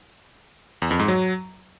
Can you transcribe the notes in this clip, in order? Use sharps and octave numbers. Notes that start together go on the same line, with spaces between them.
E2
F2
G#2
F#3